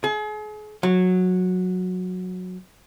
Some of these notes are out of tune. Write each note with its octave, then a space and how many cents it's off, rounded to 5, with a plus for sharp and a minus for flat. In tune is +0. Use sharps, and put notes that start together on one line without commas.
G#4 +35
F#3 -15